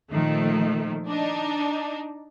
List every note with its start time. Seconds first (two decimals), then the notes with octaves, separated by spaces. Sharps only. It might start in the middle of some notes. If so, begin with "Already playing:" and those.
0.11 A#2 D#3 F3 A3
1.08 D4 D#4